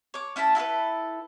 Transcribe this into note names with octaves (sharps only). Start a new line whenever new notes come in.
C#5 D6
C#4 E4 A5 B5
E4 F#4 A4 B4